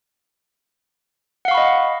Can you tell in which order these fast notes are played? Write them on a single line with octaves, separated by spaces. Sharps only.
F#5 F5 C#6 B5 D#5